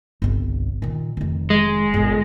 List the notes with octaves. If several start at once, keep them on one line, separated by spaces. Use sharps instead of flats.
G1 C2
A#2 D#3
F1 D#3
G#3
G1 B2